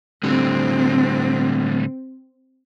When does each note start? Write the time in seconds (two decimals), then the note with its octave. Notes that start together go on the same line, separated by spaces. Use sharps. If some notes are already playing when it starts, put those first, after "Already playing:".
0.23 A2 D3 G3 C4